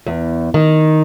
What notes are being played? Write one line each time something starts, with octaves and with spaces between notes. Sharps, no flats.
E2
D#3